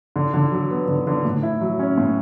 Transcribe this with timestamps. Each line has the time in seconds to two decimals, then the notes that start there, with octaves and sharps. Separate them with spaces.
0.16 D3
0.34 D3
0.52 F#3
0.70 B3
0.88 D3
1.07 D3
1.25 A2
1.43 E4
1.61 F#3
1.79 C#4
1.98 A2